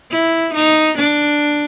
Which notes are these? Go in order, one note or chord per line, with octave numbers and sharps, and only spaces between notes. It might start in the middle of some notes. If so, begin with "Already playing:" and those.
E4
D#4
D4